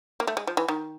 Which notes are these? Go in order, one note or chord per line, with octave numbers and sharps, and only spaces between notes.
A#3
A3
G#3
F3
E3
D#3